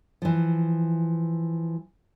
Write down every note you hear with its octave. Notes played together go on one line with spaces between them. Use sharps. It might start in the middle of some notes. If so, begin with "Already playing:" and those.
E3 F3